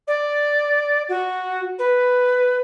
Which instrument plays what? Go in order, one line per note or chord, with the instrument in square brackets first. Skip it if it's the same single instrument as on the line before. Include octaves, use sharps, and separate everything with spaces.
[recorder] D5
F#4
B4